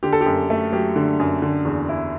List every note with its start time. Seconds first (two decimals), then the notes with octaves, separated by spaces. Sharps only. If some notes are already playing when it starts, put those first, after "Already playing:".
0.03 D3 G4
0.13 A4
0.21 G4
0.26 F#2
0.50 A3
0.73 F#3 G4
0.96 D3
1.20 F#2
1.42 D3
1.65 E2
1.89 E4